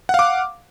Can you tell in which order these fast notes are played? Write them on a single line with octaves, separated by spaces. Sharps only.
F#5 F5 D6